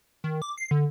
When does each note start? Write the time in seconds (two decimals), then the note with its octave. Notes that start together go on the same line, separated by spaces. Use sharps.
0.24 D#3
0.42 D6
0.57 C7
0.71 D3